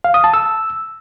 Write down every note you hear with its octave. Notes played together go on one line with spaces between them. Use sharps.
F5
D#6
A5
E6